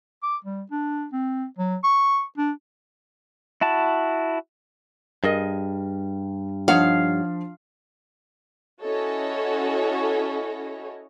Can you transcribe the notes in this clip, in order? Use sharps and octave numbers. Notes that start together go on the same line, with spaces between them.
D6
G3
D4
C4
F#3
C#6
D4
E4 F#4 A5
G2 G#4 A#4 D#5
F3 D4 D#4 C#5 F5 F#5
C#4 E4 F#4 A4 C#5 D#5